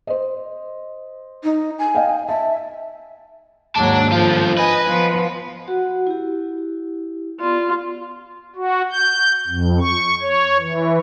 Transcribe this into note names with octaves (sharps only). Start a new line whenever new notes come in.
C5 D#5
D#4
G#5
D#5 F5 G5
E5 A5
D#2 G#2 F#3 D5 A5
G2 F3 F4
B4 D#5 G#5
F3 B3
F#4 F#5
E4 G4
B3 F4 D5
F#4
G6
F2
C#6
C#5
E3